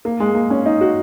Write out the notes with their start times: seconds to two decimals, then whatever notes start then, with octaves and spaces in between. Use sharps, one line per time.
0.05 A#3
0.20 G#3
0.35 A#3
0.50 C#4
0.66 D#4
0.81 F#4